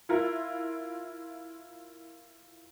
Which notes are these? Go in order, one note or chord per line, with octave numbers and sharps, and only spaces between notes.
E4 F4 A#4